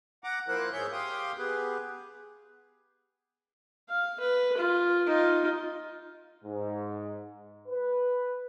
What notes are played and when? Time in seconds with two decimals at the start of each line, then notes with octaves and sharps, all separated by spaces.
0.24 F#5 A#5 D6
0.48 F3 A#3 E4 A#4 C5 F#6
0.73 G#2 G#4 C#5 E5 G6
0.92 G4 F5 G5 C6 D#6
1.38 B3 G4 G#4 B4
3.89 F5
4.20 B4
4.57 F4
5.07 D#4 F4
6.45 G#2
7.68 B4